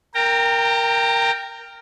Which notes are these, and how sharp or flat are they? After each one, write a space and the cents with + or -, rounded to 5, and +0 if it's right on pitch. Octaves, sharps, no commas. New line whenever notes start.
A#4 +0 G5 +10 A#5 -30